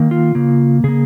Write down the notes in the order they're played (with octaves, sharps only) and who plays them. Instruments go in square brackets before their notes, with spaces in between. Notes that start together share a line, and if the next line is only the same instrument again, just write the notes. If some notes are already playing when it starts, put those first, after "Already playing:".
Already playing: [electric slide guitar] D#3 A#3
F4
C#3 A#3
C#3 A#3 G#4